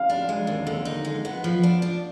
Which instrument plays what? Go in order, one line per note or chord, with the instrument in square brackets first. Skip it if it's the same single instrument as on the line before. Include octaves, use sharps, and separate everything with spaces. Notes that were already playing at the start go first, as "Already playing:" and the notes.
Already playing: [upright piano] F5
[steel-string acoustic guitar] D4
G#3
D#2
D3
D#4
G#3
B3
F3
D4
D4